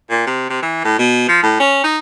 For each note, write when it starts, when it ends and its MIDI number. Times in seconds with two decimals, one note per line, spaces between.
0.10 0.23 46
0.27 0.47 48
0.50 0.60 48
0.62 0.84 52
0.84 0.99 45
0.99 1.25 47
1.29 1.42 53
1.43 1.56 45
1.60 1.80 61
1.84 1.98 63